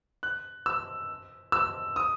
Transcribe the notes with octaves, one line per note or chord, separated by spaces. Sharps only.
F#6
E6
E6
D#6